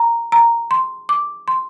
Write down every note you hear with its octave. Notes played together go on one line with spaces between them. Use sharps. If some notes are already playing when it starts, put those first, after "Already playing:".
Already playing: A#5
A#5
C6
D6
C6